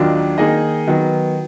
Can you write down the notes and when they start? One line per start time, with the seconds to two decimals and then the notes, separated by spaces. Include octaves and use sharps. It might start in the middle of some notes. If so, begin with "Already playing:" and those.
Already playing: D#2 D#3 F#3 D4 F4
0.38 D#3 A#3 D#4 G#4 D#5
0.88 D#3 F#3 B3